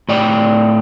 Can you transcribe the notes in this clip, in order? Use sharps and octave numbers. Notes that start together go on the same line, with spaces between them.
A2 D5 G5